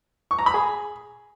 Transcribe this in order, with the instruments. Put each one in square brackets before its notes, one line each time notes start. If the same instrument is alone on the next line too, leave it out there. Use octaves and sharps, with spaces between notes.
[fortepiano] C#6
A#5
B5
G#4